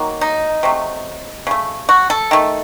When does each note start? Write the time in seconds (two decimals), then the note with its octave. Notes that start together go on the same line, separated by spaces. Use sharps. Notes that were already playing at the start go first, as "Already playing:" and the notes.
Already playing: D#3 F#3 A#3
0.21 D#4
0.63 C3 F#3 A3
1.47 C#3 A3
1.89 F#4
2.10 A4
2.31 D#3 A3